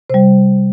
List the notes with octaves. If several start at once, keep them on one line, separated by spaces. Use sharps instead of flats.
C3 G3 C5